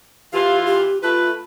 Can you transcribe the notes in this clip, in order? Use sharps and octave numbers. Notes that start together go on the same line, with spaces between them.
E3 F4 G4
G4
A3 F4 B4